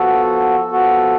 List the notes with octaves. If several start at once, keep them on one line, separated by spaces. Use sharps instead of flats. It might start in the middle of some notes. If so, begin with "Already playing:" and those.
Already playing: F3 B3 F#4 A4
F3 B3 F#4 A4